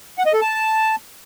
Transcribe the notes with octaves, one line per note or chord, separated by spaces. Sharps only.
F#5
D#5
A4
A5